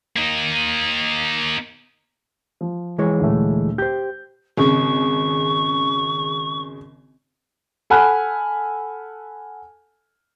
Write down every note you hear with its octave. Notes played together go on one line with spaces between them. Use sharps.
A#3 D#4
F3
E3 G#3 C#5
D2 A#2 A3
G4 C5 G6
G#1 C#3 C#6
A4 F#5 G#5 B5 F6 F#6